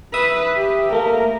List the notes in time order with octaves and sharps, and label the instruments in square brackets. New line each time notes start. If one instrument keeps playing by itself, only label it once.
[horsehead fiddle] B4 [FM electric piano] E5 D#6
[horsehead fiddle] G4
[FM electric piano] A3 A#3 [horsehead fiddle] A#4